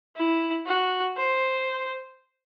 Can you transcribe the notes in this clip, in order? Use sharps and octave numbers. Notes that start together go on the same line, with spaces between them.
E4
F#4
C5